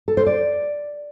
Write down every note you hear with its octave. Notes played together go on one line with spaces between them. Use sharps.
A4
C5
D5